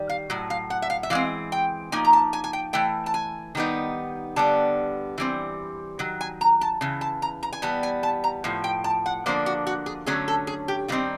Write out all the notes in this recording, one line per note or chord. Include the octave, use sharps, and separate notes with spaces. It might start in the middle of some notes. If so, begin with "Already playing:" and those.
Already playing: D#3 G3
F5
A2 F#3
F5
F#5
E5
F5
E5
E3 G#3 C4 F5
G5
F3 A#3 D#4 G#5
A#5
A5
G#5
G#5
G5
E3 A3 G5
A5
G#5
D#3 G3 B3 D#4
D3 G3 B3 A5
E3 G3 C4
D#3 F#3
G#5
A#5
A5
C#3 E3
A5
A#5
A#5
G#5
E3 G3 B3 A5
G#5
A5
A#5
A2 F3
G5
A5
F#5
D3 F3 A#3 D4 C5
F#4
F#4
G#4
D3 F#3 A3 C#4 G#4
A4
G#4
G4
D#3 G3 C4 D#4 F4